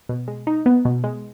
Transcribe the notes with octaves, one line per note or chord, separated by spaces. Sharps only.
B2
G#3
D#4
B3
B2
G#3